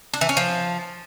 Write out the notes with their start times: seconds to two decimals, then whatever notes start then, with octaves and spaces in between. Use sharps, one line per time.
0.14 D4
0.21 E3
0.29 C#4
0.37 F3